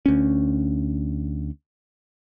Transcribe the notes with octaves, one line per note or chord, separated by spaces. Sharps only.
D2 C#4